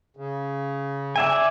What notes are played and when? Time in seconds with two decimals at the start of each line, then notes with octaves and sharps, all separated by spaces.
0.17 C#3
1.16 D5 E5 G#5